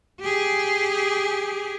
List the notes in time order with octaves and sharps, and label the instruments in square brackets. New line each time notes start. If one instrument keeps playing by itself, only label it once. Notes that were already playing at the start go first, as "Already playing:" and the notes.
[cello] G4 G#4